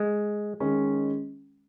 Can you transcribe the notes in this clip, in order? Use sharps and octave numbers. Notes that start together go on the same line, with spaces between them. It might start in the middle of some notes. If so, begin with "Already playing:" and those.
Already playing: G#3
D#3 G#3 C#4